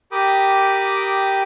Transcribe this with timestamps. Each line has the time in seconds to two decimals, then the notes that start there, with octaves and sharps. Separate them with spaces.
0.12 G4 A#4 G5 B5 D6 D#6